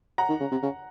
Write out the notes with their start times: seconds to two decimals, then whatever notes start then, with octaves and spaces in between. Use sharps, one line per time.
0.18 F#5 A#5
0.29 D#3
0.40 C#3
0.52 C3
0.62 C#3